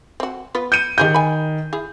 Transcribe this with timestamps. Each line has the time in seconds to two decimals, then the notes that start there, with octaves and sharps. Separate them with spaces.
0.20 C4 F#4
0.55 B3 F4 B4
0.72 G6 C#7 D#7
0.98 D#3 G4 G#4 G5 G6
1.14 G#5 B5
1.73 E4 G#4